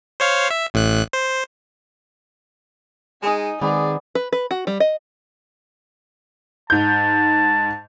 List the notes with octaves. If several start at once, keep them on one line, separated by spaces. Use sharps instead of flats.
C5 C#5 F5
E5
A1 A2 F#6
C5
G#3 D#4 G#5 D#6
D#3 G#3 B3 C4 G#4 D5
B4
B4
F#4
G3
D#5
G#2 A5 G6